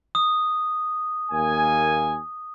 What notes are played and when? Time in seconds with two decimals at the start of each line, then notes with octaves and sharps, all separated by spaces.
0.15 D#6
1.31 D#2 A#3 G#5